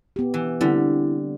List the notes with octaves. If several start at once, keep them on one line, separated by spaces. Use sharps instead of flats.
B3 G4
E3
D3 G3 C4 E4